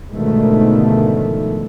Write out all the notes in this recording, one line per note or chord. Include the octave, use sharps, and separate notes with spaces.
G#2 B2 D3 D#3 F3 A3